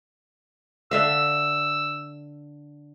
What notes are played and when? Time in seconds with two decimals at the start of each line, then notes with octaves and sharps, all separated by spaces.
0.91 D3 E5 F5 E6